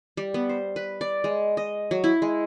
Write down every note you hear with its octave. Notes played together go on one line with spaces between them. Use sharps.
G3
B3
C5
B4
D5
G#3
D#5
F#3
E4
G#3